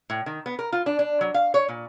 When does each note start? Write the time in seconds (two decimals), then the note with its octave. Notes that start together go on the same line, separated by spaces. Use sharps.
0.10 A2
0.26 D#3
0.46 B3
0.59 A#4
0.73 F4
0.86 D4
0.99 D4
1.21 F#3
1.34 F5
1.54 C#5
1.69 A#2